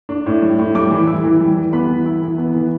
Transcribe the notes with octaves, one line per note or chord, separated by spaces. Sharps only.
D4
A2
G3
A2
G3 D6
E3
E4
E3
G3
E3
B3 B5
E3
E4
E3
B3
E3